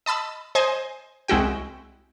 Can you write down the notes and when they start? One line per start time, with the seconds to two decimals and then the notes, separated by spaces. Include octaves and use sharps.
0.06 D#5 A5 B5 E6
0.55 C5 D#5 G#5
1.28 C2 G#3 E4 F#4 G5